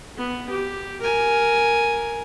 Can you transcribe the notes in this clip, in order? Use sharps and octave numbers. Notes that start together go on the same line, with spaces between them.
B3
G4
A#4 G#5